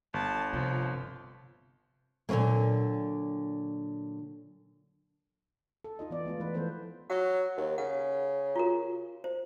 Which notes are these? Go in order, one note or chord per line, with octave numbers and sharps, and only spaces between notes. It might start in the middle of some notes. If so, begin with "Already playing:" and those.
G1 A5
C3 F3
A#2 D3 F3 F#3 A#3
A4
D#4 F4 D#5
E3 B3 D5
G#3 A3 B3 F4
E3 B4
E3 F3 B3 A4 C5
F#3 F#5 C#6
D#2
C#3 F#5
F4 F#4 A#4
C5